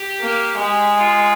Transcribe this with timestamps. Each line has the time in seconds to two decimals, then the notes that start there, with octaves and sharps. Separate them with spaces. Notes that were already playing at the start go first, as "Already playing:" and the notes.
Already playing: G4
0.21 A#3
0.59 G#3
0.97 F4